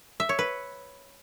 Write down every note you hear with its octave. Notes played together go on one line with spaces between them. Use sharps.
E5
C#5
B4